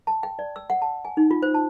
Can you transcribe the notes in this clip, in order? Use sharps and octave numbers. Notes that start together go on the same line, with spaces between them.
A5
G5
D5
E6
F#5
A5
G#5
D#4
F4
C5
A5